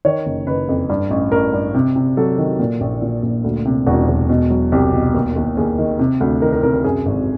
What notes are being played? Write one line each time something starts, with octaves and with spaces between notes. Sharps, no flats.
D#3 C#5
F#1
F#1 B4
F2
G2
A1
A1 A#4
G2
C3
C3
F#3 A4
D#3
A#2
A#1
A#2
A#1
D2
C3
E1 F#4
E1
B2
F#3
C2 G4
B2
D#2
D#2
D#2 G#4
D#3
C3
D2
D#3 A#4
A#4
C3 A#4
A#4
F#2 G#4
G#1